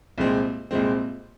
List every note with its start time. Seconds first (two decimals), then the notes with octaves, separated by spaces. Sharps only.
0.18 C2 A#2 G#3 C4
0.71 C2 A#2 G#3 C4